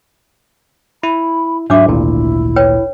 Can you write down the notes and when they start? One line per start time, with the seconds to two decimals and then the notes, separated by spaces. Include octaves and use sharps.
1.03 E4 B5
1.70 G#2 F#3 D4 E5 D6
1.88 G#1 D2 A#2 E4
2.56 B4 C#5 G5